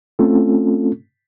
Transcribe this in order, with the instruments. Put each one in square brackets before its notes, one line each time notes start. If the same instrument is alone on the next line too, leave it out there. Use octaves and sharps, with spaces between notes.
[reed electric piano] A3 C4 C#4 F4 A4